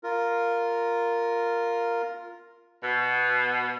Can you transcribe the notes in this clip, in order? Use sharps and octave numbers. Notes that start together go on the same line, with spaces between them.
F4 A#4
B2